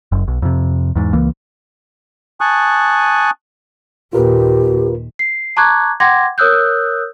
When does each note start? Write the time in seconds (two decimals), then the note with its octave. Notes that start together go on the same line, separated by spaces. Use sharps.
0.12 F#1 F#2
0.28 B1
0.42 F2 C3
0.96 E2 G#2
1.13 C#2 E3 A#3
2.41 G#5 A5 C#6 D#6 F#6
4.13 D#2 A#2 F4 G4 A#4 B4
5.19 C7
5.57 A5 A#5 C#6 D6 F#6 G#6
6.00 F#5 G5 C6 D6 G#6 A#6
6.38 A#4 C#5 D#6 E6 F#6 G6